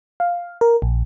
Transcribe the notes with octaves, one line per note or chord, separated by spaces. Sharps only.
F5
A#4
A#1